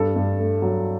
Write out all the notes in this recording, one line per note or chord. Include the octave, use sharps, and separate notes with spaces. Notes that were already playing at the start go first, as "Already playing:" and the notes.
Already playing: G2 A4
G2
A3
F#3